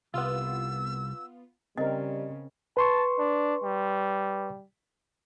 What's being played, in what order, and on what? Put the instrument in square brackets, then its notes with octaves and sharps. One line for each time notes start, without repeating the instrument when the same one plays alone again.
[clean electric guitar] C2 [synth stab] B3 F4 [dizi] E6
[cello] C#3 [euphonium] G3 [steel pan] C4 A#4 [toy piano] D#5
[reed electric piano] B4 C6 C#6 [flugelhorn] A5
[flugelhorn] D4
G3